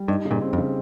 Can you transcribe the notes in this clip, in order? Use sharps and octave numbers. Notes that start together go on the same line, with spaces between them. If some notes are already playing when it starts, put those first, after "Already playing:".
Already playing: G3
G2 D#4
C#3
G2 A#2
C4
F2
C#3